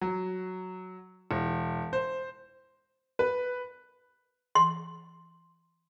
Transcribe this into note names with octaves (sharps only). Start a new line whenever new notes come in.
F#3
E1
C5
B4
C6